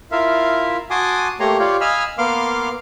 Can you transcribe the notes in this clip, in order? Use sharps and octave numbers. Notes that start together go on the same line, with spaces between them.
E4 F4 A#4 E5 F5
F#4 G#5 A5 C6 D6 D#6
A3 A#3 G4 C#5 A#5 C6
F4 G4 C#5 D5 F5 G5
D#5 F5 G#5 B5 E6 F6
A#3 B3 F5 C6 D6 F6